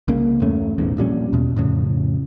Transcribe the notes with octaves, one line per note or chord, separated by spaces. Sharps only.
C2 C#3 A#3
E2 G2 A3 C#4
E1 A1 E2 G#2
A#1 A#2 G3 C#4
E2 B2
F2 A2 C#3